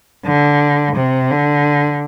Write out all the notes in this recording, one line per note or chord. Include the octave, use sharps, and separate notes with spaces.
D3
C3
D3